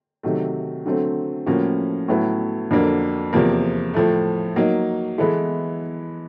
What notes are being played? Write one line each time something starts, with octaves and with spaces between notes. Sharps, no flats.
C3 D#3 F#3 A3
D3 F#3 A3 C4
A2 F3 A#3 C#4 F#4
A2 F#3 B3 E4
F2 D3 F#3 A#3 D4
E2 C3 F3 A#3
A2 F3 A3
F#3 A#3 D#4
E3 G#3 B3 E4 A4